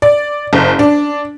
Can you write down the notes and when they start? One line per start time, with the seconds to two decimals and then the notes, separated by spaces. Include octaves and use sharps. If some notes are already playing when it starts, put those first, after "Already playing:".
0.02 D5
0.53 F#1
0.79 D4